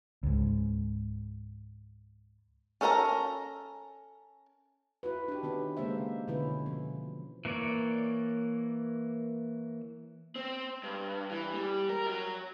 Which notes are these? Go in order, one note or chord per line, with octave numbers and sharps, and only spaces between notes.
C#2 G#2
C#4 A4 A#4 F5 A#5
E4 F#4 B4
D4 G4
D#3 B3 C#4 E4
C#3 G#3 A#3 C5 E5
B2 D3 E3 B3 C#4 E4
B2 F3
E3 A#3 C#5 D5
C4
G2
E3
G3
A#4
F#3